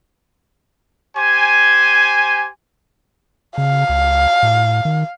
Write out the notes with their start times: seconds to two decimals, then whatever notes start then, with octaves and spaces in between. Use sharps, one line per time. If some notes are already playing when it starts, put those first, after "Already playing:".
1.16 G4 C5 G#5
3.58 C#3 F5
3.89 C#2
4.43 A2
4.85 D#3